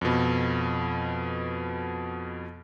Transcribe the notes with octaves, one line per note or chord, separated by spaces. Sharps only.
F2 B2